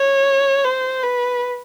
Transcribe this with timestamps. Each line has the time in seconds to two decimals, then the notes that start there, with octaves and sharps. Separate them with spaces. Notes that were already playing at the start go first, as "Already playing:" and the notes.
Already playing: C#5
0.64 C5
1.03 B4